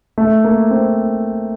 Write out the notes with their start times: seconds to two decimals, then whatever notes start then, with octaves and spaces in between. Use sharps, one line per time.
0.18 A3
0.44 A#3
0.71 C4